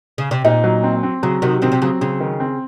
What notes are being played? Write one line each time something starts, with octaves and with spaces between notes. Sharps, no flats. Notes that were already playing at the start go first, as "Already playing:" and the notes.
C#3
C3
A#2 D#4
F#3
C4
C4
C#3 F#3
C3 D#3 F#4
C3 D#3 C4
C3
C#3 F#3
C#3 C4
D#3
C4